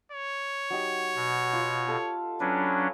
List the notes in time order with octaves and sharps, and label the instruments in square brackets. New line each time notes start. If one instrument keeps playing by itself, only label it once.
[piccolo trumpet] C#5
[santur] F#3 D#4 G4
[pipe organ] B2
[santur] F4 F5
G4 A4 F5
[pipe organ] F#3 C#4 D4 [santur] B4